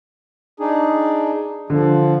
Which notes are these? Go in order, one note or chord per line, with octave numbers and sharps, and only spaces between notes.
D4 D#4 G#4
D3 F3